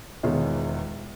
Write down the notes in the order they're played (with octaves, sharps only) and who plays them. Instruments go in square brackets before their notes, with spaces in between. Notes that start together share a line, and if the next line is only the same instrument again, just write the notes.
[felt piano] E1 E2 D#3 F4 G#4 C#5